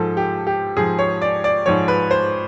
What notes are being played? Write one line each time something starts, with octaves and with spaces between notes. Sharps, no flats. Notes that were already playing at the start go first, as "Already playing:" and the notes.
Already playing: G#2 F3 A4
G4
G4
G#2 F3 G#4
C#5
D5
D5
G#2 F3 C#5
B4
C5